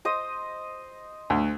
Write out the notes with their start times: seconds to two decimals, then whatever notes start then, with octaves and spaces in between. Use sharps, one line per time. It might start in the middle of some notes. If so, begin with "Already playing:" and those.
0.05 C5 D#5 D#6
1.30 D2